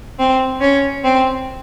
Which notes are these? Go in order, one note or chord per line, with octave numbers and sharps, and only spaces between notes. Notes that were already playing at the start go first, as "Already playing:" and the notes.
C4
C#4
C4